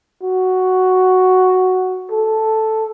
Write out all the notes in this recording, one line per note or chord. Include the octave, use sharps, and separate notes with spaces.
F#4
A4